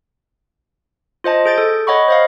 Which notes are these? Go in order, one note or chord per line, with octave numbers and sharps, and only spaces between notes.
F4 C5 D#5 A5
G#4 G6 A6 D7
A4
C#5 D#5 F#5 B5 C#6
C5 D#5 F5